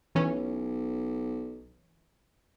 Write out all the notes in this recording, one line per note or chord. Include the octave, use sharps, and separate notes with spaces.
B1 E3 C#4